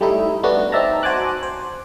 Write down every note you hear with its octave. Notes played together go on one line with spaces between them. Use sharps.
G3 A3 D#4 E4
G3 A3 B3 D4 F#4
C4 D#4 D5 E5 A5 A#5
F#4 C5 G#5 A5 D6 F#6
C5